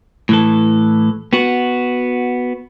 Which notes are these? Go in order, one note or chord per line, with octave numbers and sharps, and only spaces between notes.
A2 E3 A4
B3 F#4